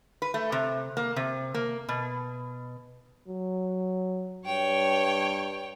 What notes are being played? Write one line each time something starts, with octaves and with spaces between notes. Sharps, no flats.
B4
A3
C3
A#3
C3
A#3
B2
F#3
G2 C#5 G5